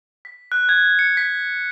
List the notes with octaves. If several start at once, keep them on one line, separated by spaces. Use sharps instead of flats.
B6
F#6
G#6
C#7
B6